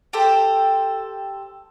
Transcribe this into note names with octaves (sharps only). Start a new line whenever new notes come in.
G4 A4 C5 G5